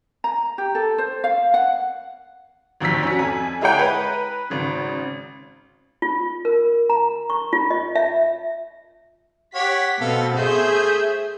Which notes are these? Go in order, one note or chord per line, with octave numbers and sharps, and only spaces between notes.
A#5
G4
A4
C5
F5
F#5
G#1 D#2 F3 E6 B6
C#4 F#4
F2 G#5
G#3 E4 G#4 C#5 F#5 G5
B4 A#5
G#1 C#3
F4
A#4
A#5
C#6
F4
D#5
E5
G4 C#5 F#5 B6
B2 B3 C4 A4 F5
A3 G#4 C5 E5 G6